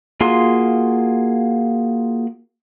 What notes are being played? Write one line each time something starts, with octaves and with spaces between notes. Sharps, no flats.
A#3 F4 F#4 G#4 C6